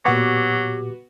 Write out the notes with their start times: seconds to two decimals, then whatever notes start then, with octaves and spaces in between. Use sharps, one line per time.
0.05 A#2 F#3 B3 F#4 G4 D6